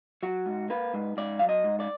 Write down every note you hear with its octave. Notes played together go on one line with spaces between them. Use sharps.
F#3 F#4
G#2
A#3 B4
G#2
G#2 D5
F#3 F5
D#5
G#2
D5